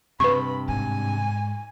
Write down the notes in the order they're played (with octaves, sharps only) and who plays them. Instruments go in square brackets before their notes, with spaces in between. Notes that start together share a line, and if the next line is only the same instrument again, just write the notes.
[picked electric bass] G2 C3 [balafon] B4 C#6 [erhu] B5
[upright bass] G#2 [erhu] G#5